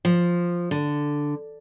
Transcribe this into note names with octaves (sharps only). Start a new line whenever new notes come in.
F3
D3